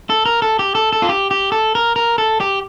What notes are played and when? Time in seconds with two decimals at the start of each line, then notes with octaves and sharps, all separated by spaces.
0.10 A4
0.26 A#4
0.42 A4
0.59 G4
0.75 A4
0.93 A4
1.02 F4
1.09 G4
1.31 G4
1.52 A4
1.75 A#4
1.96 A#4
2.18 A4
2.40 G4